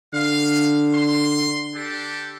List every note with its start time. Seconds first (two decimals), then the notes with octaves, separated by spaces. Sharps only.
0.13 D3 F5
0.94 C6
1.75 D4 G4 A4